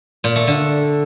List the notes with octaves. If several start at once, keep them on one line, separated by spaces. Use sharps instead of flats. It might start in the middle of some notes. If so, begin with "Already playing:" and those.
A#2
A3
D3